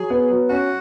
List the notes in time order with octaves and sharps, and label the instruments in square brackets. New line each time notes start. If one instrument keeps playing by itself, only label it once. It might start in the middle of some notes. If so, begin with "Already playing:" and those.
Already playing: [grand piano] F#3 [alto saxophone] G#4
[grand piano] B3
F#3
[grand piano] C#4 [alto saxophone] F#4